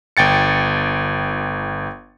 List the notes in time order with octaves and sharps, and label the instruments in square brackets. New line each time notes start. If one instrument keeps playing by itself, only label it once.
[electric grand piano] G1 G5 A6 C#7